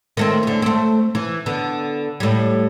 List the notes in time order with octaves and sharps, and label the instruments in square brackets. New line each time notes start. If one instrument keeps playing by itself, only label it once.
[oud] D#3 A3 C4
E2 D3
A3 C4
E3
D3 B3
A2 G3